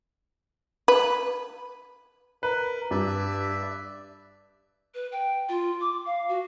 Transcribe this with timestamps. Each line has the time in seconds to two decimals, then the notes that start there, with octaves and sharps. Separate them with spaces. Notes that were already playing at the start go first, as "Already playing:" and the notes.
0.88 B4
2.43 A#4 B4
2.91 G2 D5 E5
4.94 B4
5.12 G5
5.49 F4
5.80 D6
6.05 F5
6.28 F#4